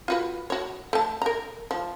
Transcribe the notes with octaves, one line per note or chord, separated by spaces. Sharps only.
F4 F#4 B4
F#4 C#5
A3 A5
A#4 A#5
F3